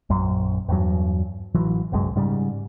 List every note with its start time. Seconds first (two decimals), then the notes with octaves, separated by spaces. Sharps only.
0.10 A#1 F#2
0.68 E2 G2 F#3
1.54 A1 E3 F#3
1.92 G1 C2 F#2 G#3
2.16 G#2 C#3 G3